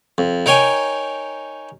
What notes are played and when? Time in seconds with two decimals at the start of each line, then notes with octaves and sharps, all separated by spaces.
0.18 F2
0.46 D#4 A#4 C#5 G5 G#5